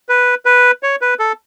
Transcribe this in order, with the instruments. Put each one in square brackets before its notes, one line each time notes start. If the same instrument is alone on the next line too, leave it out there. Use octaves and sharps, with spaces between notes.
[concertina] B4
B4
C#5
B4
A4